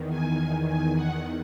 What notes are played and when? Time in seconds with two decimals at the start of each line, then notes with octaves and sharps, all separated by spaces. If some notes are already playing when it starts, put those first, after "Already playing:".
Already playing: E2 D#3
0.10 G#5
0.67 G#5
0.96 F#5